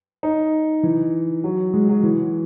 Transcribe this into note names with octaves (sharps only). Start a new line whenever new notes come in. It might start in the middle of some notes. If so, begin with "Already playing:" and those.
D#4
E3
F#3
G#3
F#3
E3